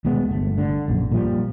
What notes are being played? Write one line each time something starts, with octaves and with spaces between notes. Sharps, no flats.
D#1 B2 G#3 B3
G1 A3
D3
A#1 F#2
A#2 F3 G3